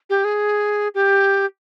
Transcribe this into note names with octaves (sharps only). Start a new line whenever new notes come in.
G4
G#4
G4